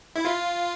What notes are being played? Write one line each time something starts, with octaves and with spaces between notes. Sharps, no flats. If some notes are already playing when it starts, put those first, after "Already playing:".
E4
F4